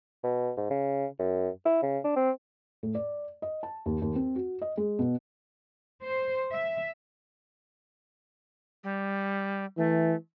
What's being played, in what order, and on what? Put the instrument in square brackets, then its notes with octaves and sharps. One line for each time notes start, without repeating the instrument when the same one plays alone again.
[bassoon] B2
G#2
C#3
F#2
E4
C#3
D4
C4
[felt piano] A2
D5
D#5
A5
D#2
D#2
C4
F#4
D#5
G#3
B2
[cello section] C5
E5
[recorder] G3
[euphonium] E3 [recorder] A3